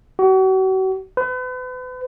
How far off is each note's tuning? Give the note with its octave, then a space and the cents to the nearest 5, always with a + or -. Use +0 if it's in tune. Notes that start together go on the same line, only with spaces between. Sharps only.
F#4 +40
B4 +40